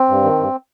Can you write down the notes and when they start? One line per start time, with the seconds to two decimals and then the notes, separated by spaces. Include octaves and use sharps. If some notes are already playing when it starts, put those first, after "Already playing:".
Already playing: C4
0.09 G2
0.24 D#3
0.39 G2